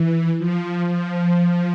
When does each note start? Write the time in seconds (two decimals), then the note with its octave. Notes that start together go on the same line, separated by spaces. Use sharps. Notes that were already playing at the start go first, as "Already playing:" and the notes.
Already playing: E3
0.39 F3
0.87 F3